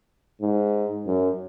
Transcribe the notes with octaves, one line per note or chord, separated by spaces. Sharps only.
G#2
F#2